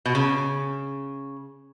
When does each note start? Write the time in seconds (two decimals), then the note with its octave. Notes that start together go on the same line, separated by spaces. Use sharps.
0.06 B2
0.15 C#3